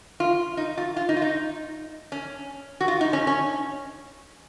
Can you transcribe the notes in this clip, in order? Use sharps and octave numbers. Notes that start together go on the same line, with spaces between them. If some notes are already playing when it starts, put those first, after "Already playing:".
F4
D#4
F4
F4
D#4
F4
D#4
C#4
F#4
F4
D#4
C#4
C#4